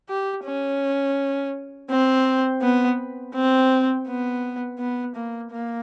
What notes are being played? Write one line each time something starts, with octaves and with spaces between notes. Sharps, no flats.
G4
C#4
C4
B3
C4
B3
B3
A#3
A#3